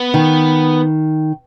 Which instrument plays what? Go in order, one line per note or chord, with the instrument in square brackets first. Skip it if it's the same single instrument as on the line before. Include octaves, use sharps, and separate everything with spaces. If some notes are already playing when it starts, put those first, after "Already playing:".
Already playing: [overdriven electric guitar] B3
[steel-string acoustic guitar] D#3